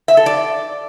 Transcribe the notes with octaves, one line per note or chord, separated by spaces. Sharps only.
E5
A4
D5